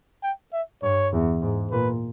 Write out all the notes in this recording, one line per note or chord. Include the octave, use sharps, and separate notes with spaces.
G5
E5
G2 C#5
E2
G#2
A#2 B4